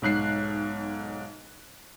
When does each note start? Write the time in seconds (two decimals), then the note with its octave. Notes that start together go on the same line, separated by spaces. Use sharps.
0.02 B1 G#2 F#6 C7